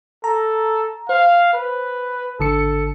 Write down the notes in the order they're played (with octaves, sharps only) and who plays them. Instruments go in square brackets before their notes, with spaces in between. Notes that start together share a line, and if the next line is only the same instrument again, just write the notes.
[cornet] A4 [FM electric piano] A#5
[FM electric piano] C5 [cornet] F5
[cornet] B4
[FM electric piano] G#1 D3 C#7 [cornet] A4